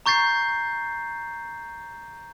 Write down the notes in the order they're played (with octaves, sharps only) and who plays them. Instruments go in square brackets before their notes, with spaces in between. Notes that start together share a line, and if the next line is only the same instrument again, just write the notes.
[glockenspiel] A#5 C#6 G6 A6 C7